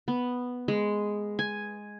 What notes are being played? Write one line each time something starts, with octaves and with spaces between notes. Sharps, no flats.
B3
G#3
G#5